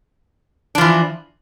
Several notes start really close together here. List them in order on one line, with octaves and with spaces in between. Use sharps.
D4 F3 E3